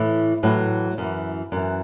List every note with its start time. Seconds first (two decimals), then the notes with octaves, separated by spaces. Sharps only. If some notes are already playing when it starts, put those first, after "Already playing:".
Already playing: A2 E3
0.43 A2 E3 F#3
0.98 F#2 E3
1.52 F#2 E3